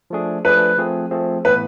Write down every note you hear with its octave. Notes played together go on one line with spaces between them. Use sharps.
F3 A3 D4 G#4
F3 A3 D4 G#4 B4
F3 A3 C4 G#4
F3 A3 C4 G#4
A2 E3 B3 B4